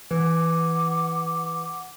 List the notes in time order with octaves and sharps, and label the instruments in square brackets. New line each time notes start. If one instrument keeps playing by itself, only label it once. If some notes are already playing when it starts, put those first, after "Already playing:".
[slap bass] E3 [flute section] F#5 D6